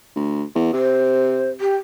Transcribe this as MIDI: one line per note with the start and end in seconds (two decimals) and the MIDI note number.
0.16 0.43 38
0.55 0.73 40
0.73 1.63 48
0.73 1.49 72
1.60 1.75 67